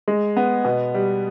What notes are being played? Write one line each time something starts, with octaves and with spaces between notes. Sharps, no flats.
G#3
B3
B2
G3